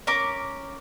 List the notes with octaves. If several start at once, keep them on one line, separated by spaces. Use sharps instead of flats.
C#4 A#4 D6